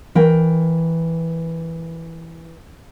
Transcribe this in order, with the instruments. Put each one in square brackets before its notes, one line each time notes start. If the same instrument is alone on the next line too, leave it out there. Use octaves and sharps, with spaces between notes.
[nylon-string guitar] E3 A#4 G5